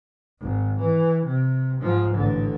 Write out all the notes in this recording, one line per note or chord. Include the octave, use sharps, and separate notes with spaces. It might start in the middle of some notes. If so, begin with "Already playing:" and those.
G#1
E3
C3
G#2 F3
A1 D3